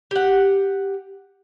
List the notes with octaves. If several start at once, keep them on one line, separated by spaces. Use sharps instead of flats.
G4 F#5